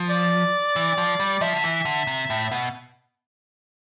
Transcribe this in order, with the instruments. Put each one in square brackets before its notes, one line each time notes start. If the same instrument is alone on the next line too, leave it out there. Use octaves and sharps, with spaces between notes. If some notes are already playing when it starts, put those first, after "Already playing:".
Already playing: [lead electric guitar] F3
[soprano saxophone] D5
[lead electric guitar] E3
F3
G3
[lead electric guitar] F3 [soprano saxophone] E5
[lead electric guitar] D3
E3
D3
C3
A2
B2